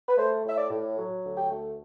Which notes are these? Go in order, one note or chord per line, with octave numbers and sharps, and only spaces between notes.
B4
A3 C5
A2 E5
D5
A2
F#3
D2
G5
A3